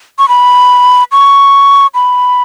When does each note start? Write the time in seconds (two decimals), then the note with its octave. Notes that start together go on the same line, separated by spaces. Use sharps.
0.19 C#6
0.29 B5
1.12 C#6
1.95 B5